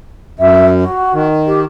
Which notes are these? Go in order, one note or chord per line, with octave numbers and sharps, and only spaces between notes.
F#2 E5
F#4
D#3
G4